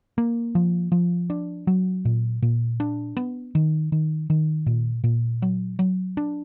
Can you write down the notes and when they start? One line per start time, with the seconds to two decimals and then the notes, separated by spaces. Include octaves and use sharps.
0.18 A#3
0.55 F3
0.92 F3
1.30 D4
1.67 F#3
2.05 A#2
2.42 A#2
2.80 D4
3.17 B3
3.55 D#3
3.92 D#3
4.30 D#3
4.66 A#2
5.04 A#2
5.42 F#3
5.79 F#3
6.17 D4